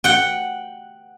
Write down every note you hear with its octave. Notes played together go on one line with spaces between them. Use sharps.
F#5 G5